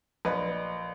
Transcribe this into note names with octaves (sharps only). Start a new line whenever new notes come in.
A#1 B4 D#5